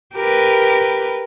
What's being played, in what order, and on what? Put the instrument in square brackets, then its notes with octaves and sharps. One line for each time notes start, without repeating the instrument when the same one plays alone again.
[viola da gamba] G4 A#4 B4